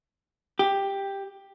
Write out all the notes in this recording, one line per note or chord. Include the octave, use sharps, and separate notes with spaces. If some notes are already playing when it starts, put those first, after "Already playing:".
G4